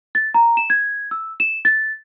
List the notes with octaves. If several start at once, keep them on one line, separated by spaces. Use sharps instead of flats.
A6
A#5
E7
G#6
E6
E7
A6